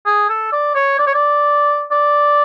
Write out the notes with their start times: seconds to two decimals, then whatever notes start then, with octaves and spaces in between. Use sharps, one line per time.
0.06 G#4
0.30 A4
0.52 D5
0.76 C#5
0.99 D5
1.07 C#5
1.14 D5
1.91 D5